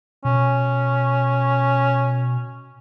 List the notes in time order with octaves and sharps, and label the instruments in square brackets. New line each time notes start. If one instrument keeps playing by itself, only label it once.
[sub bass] B2 [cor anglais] C#4